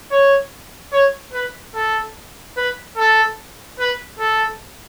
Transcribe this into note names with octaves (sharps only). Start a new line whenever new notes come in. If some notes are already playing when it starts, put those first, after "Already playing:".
C#5
C#5
B4
A4
B4
A4
B4
A4